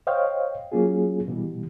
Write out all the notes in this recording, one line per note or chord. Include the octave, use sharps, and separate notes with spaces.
C5 C#5 D#5 F5 G5
F#3 A#3 C#4 F4 G#4
B2 E3 G3